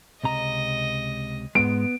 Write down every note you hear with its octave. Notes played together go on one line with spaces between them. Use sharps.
C#2 C3 D#5 A#5
G#2 G#3 B3 D7